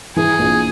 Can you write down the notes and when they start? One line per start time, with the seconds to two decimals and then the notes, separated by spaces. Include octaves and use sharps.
0.16 E3 G#4
0.39 A#1